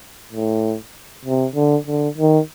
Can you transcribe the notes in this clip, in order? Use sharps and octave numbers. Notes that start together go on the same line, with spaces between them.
A2
C3
D3
D3
D#3